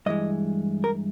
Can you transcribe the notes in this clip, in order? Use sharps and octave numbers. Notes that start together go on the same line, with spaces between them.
G2 E3 G#3 D#5
A#4